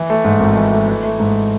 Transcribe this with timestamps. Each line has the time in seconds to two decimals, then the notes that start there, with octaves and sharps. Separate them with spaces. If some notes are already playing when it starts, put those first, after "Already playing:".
Already playing: E3
0.10 A3
0.25 G#2
0.40 G#1
0.57 E3
0.73 A3
0.88 E3
1.04 A3
1.20 G#2